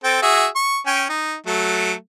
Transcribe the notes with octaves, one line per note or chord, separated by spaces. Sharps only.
C4 A4 G5
F#4 G#4 E5
C#6
C#4 G5 G#5
D#4
F#3 A3